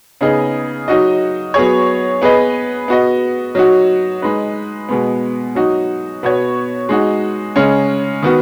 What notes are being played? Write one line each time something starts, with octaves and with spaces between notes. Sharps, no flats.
C#3 B3 D#4 G#4 D#5
F#3 D#4 F#4 D#5
F#3 B3 G#4 C#5
B3 G#4 B4 D#5
B3 F#4 D#5
F#3 D#4 F#4
G#3 D#4 B4
B2 G#3 B3
F#3 D#4 F#4
B2 B3 F#4 C#5
G#3 D#4 F#4
C#3 G#3 C#4
D#3 B3 F#4